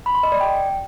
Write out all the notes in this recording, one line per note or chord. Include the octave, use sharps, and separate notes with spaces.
B5
C6
D#5
D5
G5